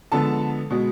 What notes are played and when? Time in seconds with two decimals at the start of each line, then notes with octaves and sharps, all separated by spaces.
0.12 D3 F3 G#3 B3 A4 A5
0.70 B2 G#3 B3